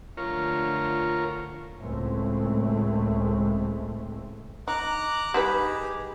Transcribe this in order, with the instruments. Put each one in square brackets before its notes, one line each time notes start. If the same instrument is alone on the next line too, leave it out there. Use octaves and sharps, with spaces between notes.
[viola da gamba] D3 F3 A3 [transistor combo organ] F4 A#4 C#5
[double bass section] C#2 A2 G#3 A3 C4
[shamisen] D#4 [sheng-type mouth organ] A#5 D6 F#6
[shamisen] G3 D#4 B4 [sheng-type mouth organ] G4 G#4